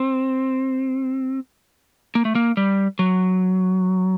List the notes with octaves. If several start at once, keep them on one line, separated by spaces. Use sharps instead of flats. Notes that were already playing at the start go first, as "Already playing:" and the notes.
Already playing: C4
A#3
A3
A#3
G3
F#3